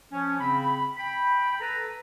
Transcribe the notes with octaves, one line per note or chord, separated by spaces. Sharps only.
F3 C#4
C#3 C4 B5
G5 B5
A4 B4 A#5